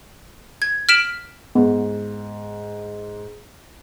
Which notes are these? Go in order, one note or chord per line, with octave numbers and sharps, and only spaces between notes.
G#6
F6 B6 D7 E7 F#7
G#2 B3